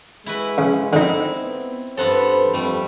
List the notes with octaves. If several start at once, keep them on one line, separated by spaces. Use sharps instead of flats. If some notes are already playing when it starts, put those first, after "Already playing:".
G#3 E4 F#4 B4
C#3
D3 C4 D#4 E4
B3
G2 B3 A4 C5
F2 G3 A3